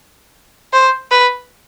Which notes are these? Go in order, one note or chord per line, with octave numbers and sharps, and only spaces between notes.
C5
B4